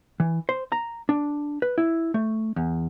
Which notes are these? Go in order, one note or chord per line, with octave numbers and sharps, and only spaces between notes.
E3
C5
A#5
D4
B4
E4
A3
E2